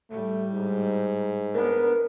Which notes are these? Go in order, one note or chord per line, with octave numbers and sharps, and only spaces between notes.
A2 G3 A3
G#2
B3 D4 A#4